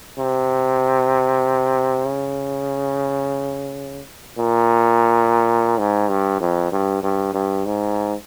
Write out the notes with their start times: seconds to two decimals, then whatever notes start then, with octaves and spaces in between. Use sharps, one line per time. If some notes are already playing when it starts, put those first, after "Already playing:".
0.19 C3
2.05 C#3
4.38 A#2
5.79 G#2
6.10 G2
6.40 F2
6.72 G2
7.03 G2
7.34 G2
7.65 G#2